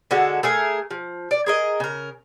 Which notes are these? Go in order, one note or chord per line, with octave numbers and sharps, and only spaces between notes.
D3 G#3 F#4 A4
A3 G#4 A#4
F3
D5
G#4 A#4 D#5
C#3 A#4